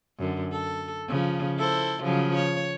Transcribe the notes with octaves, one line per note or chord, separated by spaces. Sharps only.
F#2 D3
A4
C#3 F3
E4 A4 C5
C#3 F3 F#3
C#5